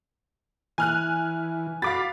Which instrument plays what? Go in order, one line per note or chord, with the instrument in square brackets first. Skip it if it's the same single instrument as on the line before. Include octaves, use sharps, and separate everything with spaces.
[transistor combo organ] E3 [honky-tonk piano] G#5 F6 F#6
[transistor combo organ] F#4 B5 [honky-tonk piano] F5 D6 A6